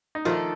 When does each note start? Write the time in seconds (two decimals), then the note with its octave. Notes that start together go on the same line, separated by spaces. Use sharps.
0.15 D#4
0.25 D#3 F3 A3 D4 F4 A4